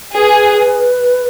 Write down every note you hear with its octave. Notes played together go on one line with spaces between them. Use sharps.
G#4 B4